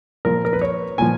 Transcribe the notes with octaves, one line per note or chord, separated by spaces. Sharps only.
A#2 F3 A#4
A#4
B4
C#5
A#2 F3 G#5